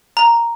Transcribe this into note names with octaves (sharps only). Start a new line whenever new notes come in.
A#5